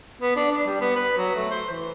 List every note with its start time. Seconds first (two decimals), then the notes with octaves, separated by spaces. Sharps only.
0.21 B3
0.36 D4
0.51 D4
0.66 G3
0.80 B3
0.96 B4
1.17 F#3
1.35 A3
1.51 C5
1.70 E3